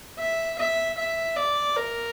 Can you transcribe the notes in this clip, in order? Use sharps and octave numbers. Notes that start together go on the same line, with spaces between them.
E5
E5
E5
D5
A#4